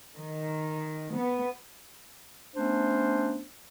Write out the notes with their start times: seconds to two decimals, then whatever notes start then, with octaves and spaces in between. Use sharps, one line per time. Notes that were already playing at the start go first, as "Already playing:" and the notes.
0.15 D#3
1.15 B3
2.56 A3 B3 C#4 D4 C5